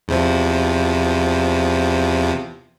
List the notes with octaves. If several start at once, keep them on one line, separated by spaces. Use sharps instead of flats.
E2 C3 F3